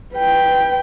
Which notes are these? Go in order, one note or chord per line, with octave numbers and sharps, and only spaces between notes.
B4 G5